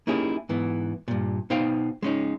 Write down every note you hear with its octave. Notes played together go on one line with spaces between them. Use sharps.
A#3 C#4 D#4 E4 G4 G#4
G#2 E3 B3
G2 A#2
B2 D#4 C5 F5 G5
G#3 C#4 D#4